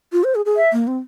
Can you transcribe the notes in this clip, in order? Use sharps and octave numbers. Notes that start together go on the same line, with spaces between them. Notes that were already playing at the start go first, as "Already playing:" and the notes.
F4
C5
G#4
G#4
E5
A#3
C4